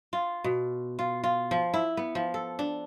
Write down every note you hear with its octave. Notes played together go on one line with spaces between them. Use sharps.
F4
B2
F4
F4
F3
E4
B3
F3
A4
D4